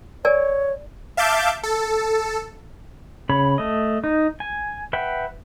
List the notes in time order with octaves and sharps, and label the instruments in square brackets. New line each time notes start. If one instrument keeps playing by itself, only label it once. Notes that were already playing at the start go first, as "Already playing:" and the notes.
[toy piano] A#4 D5 G#5 [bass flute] C#5
[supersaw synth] E5 F5 A5 D6 G6
A4
[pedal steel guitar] C#3 C#5 B5
A3 D#5
D#4
G#5
B4 E5 F#5 G5